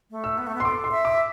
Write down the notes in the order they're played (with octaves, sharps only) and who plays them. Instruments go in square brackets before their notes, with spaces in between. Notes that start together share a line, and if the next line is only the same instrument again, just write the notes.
[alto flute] A3
[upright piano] E6
[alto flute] B3
A3
B3
[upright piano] C6
[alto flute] A4 [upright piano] D6
[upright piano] C6
[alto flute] E5
[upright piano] D6